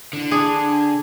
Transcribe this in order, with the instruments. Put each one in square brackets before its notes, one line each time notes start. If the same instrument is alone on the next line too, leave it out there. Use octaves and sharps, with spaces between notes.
[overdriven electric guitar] D3 [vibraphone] E4
[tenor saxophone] D4 [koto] G#4 [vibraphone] G#5 A5